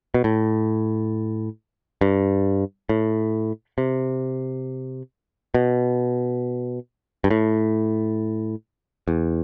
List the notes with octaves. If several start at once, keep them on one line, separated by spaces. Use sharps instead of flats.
B2
A2
G2
A2
C3
B2
G2
A2
E2